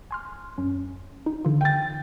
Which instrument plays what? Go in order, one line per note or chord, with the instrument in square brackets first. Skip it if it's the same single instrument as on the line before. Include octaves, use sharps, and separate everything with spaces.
[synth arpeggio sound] G#5 C6 F6
F#2 C#4
D#4
D3 E3 F4
[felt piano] G5 A6